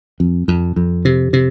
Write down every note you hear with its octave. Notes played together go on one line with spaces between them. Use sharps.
F2
F2
F2
C3
C3